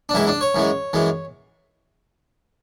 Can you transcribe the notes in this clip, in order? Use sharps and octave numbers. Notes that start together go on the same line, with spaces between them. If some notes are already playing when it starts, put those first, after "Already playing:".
D4
F#2 E3 G#3 E4
D4
C#5
F#2 E3 G#3
F#2 E3 G#3